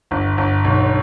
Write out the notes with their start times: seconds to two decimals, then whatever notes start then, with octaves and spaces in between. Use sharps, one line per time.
0.11 G1
0.37 G1
0.64 B1